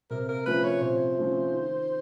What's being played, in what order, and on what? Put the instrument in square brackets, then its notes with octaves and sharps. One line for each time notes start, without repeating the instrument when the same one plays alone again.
[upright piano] C3 [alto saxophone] A#4
[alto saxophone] A#4
[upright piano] F3 A3 C#4 [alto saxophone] B4
[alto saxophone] C#5
[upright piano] C3 [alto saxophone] C5
[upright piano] F3 A3 C#4
D#3